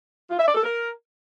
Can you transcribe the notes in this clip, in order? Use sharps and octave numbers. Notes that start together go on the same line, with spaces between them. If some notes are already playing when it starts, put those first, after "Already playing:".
F4
E5
D5
A4
A#4